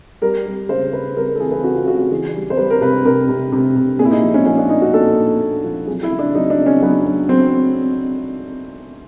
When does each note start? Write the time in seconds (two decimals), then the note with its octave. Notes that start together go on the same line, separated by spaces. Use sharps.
0.22 G3 A#4
0.46 G3
0.69 C#3 C5
0.93 C#3 B4
1.17 G3 A#4
1.28 A#4
1.35 A4
1.40 E3 G#4
1.51 B4
1.63 C#3 F#4
1.75 F4
1.87 C#3 F#4
1.99 F#4
2.11 E3 G#4
2.35 G3
2.50 C5
2.57 G3 B4
2.70 A#4
2.81 C3 B4
3.05 C3 A#4
3.29 C3
3.52 C3
3.76 C3
3.99 A#2 G#4
4.05 E4
4.11 D#4
4.23 F3
4.34 C#4
4.46 F3 C#4
4.58 D4
4.69 A#2 D#4
4.82 F#4
4.94 A#2 A4
5.17 A#2
5.41 A#2
5.64 F3
5.87 F#3 G#4
6.03 E4
6.12 C#3
6.19 D4
6.35 F#3 D#4
6.50 D4
6.59 C#3
6.66 C#4
6.82 F#3 B3
7.05 F#3
7.29 F#3 C4